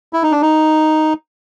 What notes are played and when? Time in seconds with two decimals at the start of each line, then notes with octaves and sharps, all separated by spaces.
0.13 E4
0.23 D#4
0.32 D4
0.42 D#4